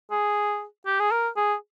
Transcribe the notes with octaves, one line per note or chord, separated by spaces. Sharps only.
G#4
G4
G#4
A#4
G#4